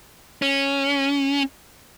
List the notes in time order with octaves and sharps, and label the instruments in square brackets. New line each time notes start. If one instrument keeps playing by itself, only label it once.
[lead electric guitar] C#4